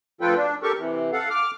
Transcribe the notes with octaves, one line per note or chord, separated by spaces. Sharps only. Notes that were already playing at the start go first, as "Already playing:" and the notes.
D2 F3 F4 A4 B4 G5
D4
G4 A4 A#4 C#6
C3 E3
A4 F5 F#5
D6 F6